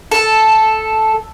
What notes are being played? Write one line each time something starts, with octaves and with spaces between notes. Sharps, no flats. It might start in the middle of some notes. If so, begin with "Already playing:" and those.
A4